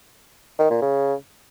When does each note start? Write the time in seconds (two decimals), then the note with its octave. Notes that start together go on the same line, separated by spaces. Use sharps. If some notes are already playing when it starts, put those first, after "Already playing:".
0.59 D#3
0.70 A#2
0.82 C#3